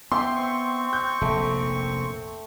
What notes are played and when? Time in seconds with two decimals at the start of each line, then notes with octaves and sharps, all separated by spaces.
0.12 B3 E5 G5 C6
0.36 C4 C#6
0.93 G6
1.21 F1 A#1 A#2 A3